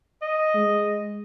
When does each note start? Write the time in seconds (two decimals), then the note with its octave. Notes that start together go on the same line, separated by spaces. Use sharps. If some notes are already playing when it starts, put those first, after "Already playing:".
0.22 D#5
0.55 G#3